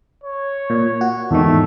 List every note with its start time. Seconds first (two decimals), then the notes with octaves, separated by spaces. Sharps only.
0.24 C#5
0.70 A#2
1.01 F#4
1.31 E2 G#2 D#3 A3